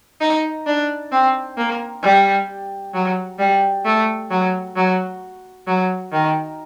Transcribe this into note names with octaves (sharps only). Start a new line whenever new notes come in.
D#4
D4
C4
A#3
G3
F#3
G3
A3
F#3
F#3
F#3
D#3